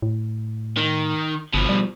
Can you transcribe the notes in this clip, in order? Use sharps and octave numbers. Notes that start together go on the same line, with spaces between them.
A2
D#3
G1 B2 F3
G3